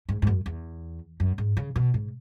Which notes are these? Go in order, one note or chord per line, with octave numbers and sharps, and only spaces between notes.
G#2
G#2
F#2
E2
F#2
G#2
C#3
B2
G#2